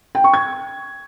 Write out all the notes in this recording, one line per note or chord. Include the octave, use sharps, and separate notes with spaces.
G5
C#6
G#6